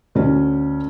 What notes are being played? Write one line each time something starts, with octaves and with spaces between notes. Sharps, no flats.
D2 C#4